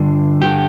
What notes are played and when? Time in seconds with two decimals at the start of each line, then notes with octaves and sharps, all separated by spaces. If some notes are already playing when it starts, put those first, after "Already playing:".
Already playing: G2 D3 F4
0.41 G2 D3 G4